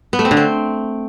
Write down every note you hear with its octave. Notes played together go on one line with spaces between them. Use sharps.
B3
A3
C4
D3
C4